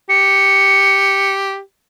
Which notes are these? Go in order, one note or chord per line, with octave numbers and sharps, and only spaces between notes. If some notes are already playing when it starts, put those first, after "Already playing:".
G4 C#7